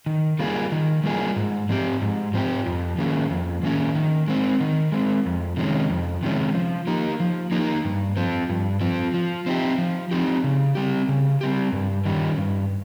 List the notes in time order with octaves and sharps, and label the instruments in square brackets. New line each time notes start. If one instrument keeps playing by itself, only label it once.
[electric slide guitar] D#3
G3 A#3 F4 G#4
D#3
G3 A#3 F4 G#4
G#2
F3 C4 G4
G#2
F3 C4 G4
F2
D#3 A#3 C#4 G#4
F2
D#3 A#3 C#4 G#4
D#3
G#3 C4
D#3
G#3 C4
F2
C3 D#3 G#3 C#4
F2
C3 D#3 G#3 C#4
F3
A#3 D#4 G4
F3
A#3 D#4 G4
G2
F3 C4
G2
F3 C4
F3
C4 D#4 G4
F3
C4 D#4 G4
C#3
G3 C4 G4
C#3
G3 C4 G4
G2
D#3 G3 C#4 G4
G2